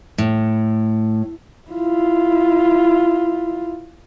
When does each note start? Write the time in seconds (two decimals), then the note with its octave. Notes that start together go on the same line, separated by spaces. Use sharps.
0.18 A2
1.71 E4 F4